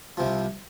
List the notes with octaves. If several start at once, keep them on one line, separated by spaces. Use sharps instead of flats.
C2 C3 F3